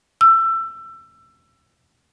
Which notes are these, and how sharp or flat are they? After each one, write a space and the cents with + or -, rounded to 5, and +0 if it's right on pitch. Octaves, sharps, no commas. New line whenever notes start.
E6 +25